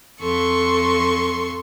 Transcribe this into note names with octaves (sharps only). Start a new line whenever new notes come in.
F2 A4 C6 C#6